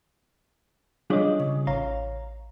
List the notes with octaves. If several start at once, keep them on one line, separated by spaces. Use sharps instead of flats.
G3 D4 F4 G#4 C#5 D#5
C#3
A1 C#5 F5 A#5